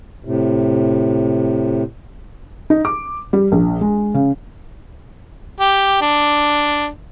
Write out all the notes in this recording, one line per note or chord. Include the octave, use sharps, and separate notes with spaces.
A2 C3
D#4
D6
G3
A#1
G#3
C#3
G4
D4